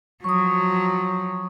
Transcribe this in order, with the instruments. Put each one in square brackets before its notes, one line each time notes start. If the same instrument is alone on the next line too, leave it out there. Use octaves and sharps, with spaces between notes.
[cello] F3 F#3 [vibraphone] C#6 D#6